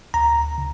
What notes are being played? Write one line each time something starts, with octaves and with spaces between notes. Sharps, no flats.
D2 A#5
C#3